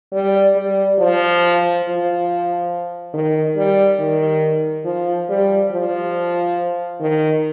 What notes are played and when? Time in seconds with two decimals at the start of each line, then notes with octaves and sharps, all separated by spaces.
0.12 G3
0.56 G3
0.99 F3
1.84 F3
3.14 D#3
3.57 G3
3.99 D#3
4.85 F3
5.29 G3
5.71 F3
7.01 D#3